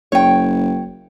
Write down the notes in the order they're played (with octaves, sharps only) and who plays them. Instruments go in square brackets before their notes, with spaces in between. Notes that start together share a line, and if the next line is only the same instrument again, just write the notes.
[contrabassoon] F#1 [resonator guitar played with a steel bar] C#5 G5